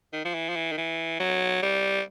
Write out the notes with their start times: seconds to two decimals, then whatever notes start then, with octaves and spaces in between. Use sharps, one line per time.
0.13 D#3
0.24 F3
0.34 E3
0.49 F3
0.56 E3
0.72 D#3
0.77 E3
1.19 F#3
1.62 G3